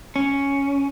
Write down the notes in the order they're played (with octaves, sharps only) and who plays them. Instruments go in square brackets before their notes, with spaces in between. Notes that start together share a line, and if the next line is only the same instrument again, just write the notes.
[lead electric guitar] C#4